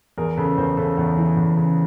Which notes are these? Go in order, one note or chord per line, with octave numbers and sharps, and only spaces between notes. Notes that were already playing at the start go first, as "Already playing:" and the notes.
E2 G#4 A#4
C#3 A4 B4
E2 A#4 C5
C#3 A4 B4
E2
E3
E2
C#3